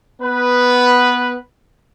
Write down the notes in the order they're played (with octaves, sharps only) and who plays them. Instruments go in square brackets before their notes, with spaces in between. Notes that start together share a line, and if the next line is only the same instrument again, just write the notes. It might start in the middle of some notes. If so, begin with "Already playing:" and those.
[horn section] B3 B4